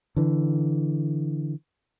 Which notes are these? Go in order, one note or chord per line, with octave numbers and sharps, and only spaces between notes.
D3 E3